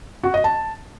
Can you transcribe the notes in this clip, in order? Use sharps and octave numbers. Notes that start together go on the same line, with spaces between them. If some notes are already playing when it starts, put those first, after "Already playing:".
F#4
D#5
A5